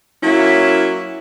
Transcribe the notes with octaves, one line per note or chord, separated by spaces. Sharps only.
F#3 A#3 C#4 E4